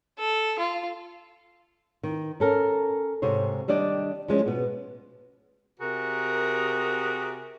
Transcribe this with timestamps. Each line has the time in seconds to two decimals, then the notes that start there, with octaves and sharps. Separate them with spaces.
0.18 A4
0.59 F4
2.03 D#3
2.40 C#4 A4 A#4
3.22 G#2 C3 C5 C#5
3.68 D#3 G3 D4 D5 D#5
4.28 F3 G#3 C#4
4.46 B2 B3
5.80 C3 F#4 G#4 A#4